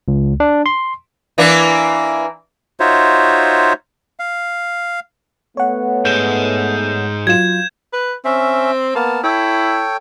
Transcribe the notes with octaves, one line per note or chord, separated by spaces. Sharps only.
C#2
D4
C6
E3 A#3 D4
D#4 F4 F#4 C5 C#5 E5
F5
A3 B3 C#5 F#5
G#2 G#3 G6 E7
F#3 F4 G#6 E7
B4
C4 C#4 E5
A#3 B3 A5
E4 A4 C#5 G5